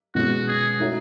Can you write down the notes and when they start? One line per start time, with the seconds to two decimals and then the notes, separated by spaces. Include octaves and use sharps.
0.15 B2 G#3 C#4 F#4
0.48 G#4
0.80 A3 D#4 F#4 C#5 E5